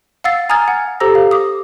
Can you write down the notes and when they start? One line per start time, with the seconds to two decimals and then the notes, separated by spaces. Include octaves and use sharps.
0.24 F5 F#5 E6 A6 C7
0.49 G#5 A#5 D#6 F6 G#6 A6
0.68 F#5
1.00 G4 A4 C5 A#5 E6 A#6
1.15 F5
1.31 D6 D#6